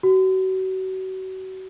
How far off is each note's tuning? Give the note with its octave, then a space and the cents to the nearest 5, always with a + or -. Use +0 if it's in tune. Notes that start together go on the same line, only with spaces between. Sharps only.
F#4 +35